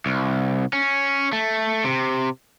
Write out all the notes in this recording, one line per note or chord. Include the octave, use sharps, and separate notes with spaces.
C2
C#4
A3
C3